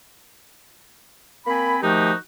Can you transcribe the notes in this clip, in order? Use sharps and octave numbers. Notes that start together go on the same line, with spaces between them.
A#3 C4 G#5 B5
D#3 F3 A3 D#4 F#4 G4